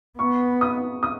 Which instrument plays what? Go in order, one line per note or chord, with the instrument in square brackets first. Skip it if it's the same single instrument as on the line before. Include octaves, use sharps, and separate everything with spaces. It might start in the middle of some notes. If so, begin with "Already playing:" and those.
[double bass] B3 [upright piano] C#6
[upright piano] D#6
D#6